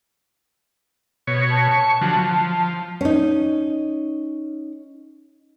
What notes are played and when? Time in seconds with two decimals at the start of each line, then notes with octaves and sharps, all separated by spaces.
1.27 B2 C#5
1.51 A5
1.71 C#6
2.01 D3 F3 F#3
2.19 F3
3.01 C#4 D#4